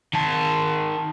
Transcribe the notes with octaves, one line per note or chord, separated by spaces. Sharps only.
D#3 A5